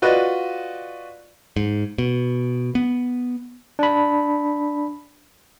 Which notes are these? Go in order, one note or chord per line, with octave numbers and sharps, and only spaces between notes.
F4 F#4 B4 D5 D#5
G#2
B2
B3
D4 B5